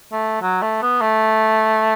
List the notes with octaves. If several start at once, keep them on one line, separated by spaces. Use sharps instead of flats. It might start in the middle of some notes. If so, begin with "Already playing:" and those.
A3
F#3
A3
B3
A3